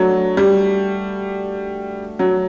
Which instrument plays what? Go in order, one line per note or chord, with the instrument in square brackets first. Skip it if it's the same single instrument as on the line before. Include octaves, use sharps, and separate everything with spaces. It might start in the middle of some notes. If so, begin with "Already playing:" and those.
Already playing: [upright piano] F#3 [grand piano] A3 D4 F#4
[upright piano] G3
F#3